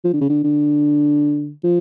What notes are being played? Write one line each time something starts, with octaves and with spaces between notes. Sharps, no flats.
F3
D3
C#3
D3
D3
F3